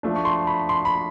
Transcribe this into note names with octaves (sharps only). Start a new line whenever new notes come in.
F3 A3 D4
C#6
C6
B5
C6
B5